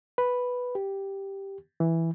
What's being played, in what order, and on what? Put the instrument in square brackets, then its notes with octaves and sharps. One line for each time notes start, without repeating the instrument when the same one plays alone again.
[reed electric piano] B4
G4
E3